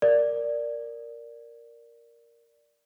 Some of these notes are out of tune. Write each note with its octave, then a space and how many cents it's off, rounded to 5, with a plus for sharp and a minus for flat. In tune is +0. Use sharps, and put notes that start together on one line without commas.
A#4 +0 D5 +0